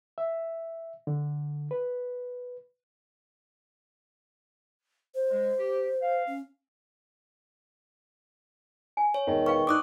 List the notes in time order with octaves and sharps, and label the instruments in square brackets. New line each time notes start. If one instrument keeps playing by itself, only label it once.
[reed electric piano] E5
D3
B4
[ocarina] C5
[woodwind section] G#3
G4
F5
[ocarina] C#4
[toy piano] G#5
[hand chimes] C#5
[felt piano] E1 [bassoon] D#3
[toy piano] B4 F5 G5 [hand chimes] C#6
[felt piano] D4 D#4 [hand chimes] D6 D#6 F#6